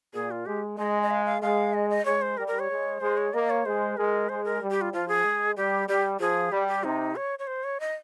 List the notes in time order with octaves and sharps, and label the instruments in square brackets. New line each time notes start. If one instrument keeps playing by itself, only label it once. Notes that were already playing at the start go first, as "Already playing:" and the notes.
[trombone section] A#2 [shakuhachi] G#4
[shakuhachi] F4
[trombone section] G#3 [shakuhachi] G4
[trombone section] G#3 [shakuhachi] D#5
[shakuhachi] D#5
F5
F5
[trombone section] G#3 [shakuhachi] F5
[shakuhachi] D#5
D#5
[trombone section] G#3 [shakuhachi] C#5
[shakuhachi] C5
[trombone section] G3 [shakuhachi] A#4
[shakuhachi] A#4
C#5
[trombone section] G#3
[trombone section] G#3 [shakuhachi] C5
[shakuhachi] C#5
[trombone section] A#3 [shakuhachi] D#5
[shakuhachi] C#5
[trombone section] G#3 [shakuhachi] C5
[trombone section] G#3 [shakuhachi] A#4
[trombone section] G#3 [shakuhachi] C5
[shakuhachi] A#4
[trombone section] G3
[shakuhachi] G4
F4
[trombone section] F3 [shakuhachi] F4
[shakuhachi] G#4
[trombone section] G#3
[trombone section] G3 [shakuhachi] G4
[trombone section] G3 [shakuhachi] G4
[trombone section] F3 [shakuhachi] G#4
[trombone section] G3 [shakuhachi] G4
[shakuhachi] G4
[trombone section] C3 [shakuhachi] D#4
[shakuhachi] C#5
C#5
C5
C#5
D#5